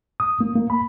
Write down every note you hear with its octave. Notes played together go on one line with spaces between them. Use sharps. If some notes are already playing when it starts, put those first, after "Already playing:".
D#6
A#3
A#3
B5